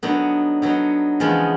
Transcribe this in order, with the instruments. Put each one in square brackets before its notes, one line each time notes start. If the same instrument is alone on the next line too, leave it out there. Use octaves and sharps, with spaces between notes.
[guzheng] D3 F#3 B3 D#4
D3 F#3 B3 D#4
E2 C#3 F3 G#3 B3